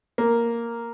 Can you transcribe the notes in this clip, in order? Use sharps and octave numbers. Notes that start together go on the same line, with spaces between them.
A#3